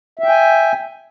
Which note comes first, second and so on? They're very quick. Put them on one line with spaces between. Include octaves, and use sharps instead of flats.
E5 G5 G#5